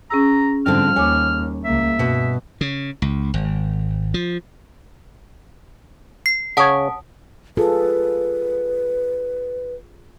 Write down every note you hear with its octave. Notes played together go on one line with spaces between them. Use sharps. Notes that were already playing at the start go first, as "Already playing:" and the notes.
C#4 G#4 A#5 E6
G#2 D3 F3 G3 C4 D4 F6
D#2 C#5 G#5 D6
C#2 A#3 E5
G2 B2
C#3
C#2
G#1
F3
C7
C#3 C#5 F#5 A5 D#6
F4 G#4 A4 B4